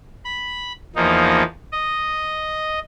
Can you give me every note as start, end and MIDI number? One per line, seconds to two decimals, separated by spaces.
0.24 0.73 83
0.96 1.43 40
0.96 1.43 53
0.96 1.43 58
0.96 1.43 63
1.72 2.79 75